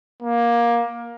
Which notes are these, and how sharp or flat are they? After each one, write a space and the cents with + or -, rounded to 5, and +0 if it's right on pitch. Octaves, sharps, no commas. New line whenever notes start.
A#3 +15